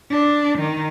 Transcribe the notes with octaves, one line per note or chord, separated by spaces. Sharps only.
D4
D#3